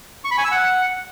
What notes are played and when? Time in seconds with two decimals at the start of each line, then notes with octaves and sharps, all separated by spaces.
0.24 C#6
0.31 B5
0.38 G#5
0.45 E6
0.51 F#5